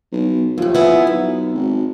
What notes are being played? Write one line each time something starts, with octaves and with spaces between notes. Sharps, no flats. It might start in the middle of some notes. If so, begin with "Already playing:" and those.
B1
D#2 A2 F3
B3 E4 G#4
B1 F#2
G#1